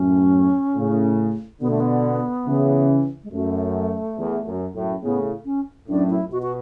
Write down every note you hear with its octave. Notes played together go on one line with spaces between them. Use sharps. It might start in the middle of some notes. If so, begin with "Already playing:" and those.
Already playing: F#2 A2 C#4
A2 C#3
B2 D3 B3
A3
B3
C#3 E3
G#3
F#2 A3
E2
F#2
F#2 A2
A2 C#3 B3
C#4
F#2 A2 D4
E4
B2 F#4
F#4